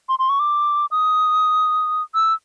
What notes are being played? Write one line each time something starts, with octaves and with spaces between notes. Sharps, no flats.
C6
C6
C#6
D6
D#6
E6